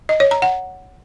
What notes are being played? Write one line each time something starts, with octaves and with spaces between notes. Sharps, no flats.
D#5
C#5
A#5
F#5